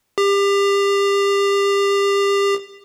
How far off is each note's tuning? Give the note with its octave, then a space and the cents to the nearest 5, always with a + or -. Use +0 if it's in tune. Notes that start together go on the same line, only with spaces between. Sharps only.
G4 +30